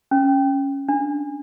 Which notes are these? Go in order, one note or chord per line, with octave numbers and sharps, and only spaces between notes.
C#4
D4